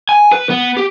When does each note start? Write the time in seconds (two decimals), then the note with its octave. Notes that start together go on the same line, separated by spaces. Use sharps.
0.09 G#5
0.32 B4
0.50 B3
0.77 G4